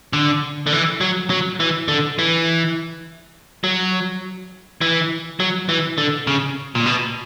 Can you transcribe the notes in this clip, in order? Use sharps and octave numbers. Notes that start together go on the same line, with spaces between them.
D3
D3
E3
F#3
F#3
E3
D3
E3
F#3
E3
F#3
E3
D3
C#3
A#2
B2